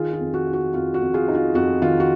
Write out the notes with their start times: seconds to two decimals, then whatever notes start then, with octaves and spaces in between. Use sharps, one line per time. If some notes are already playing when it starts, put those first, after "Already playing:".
Already playing: D#3 F4 G#4
0.13 F4
0.20 F2
0.34 F#4
0.47 D#4
0.53 F#4
0.74 F2 F4
0.94 F#4
1.01 F2
1.14 F4 G#4
1.28 D#4
1.35 F4
1.55 F2 F#4
1.82 D#3 F4
2.00 F#4